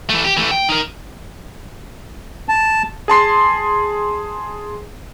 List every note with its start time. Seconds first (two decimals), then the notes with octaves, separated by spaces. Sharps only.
0.09 E3 A3
0.24 G4
0.37 E3 A3
0.51 G5
0.69 D#4 A#4
2.49 A5
3.08 G#4 A5 C6 C7